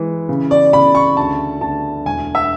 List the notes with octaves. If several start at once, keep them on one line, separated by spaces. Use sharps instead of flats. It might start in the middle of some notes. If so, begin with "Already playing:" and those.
Already playing: E3 G#3
C#3
D5
C#3 B5
C#6
D2 A5
D2 A5
E1 G#5
E5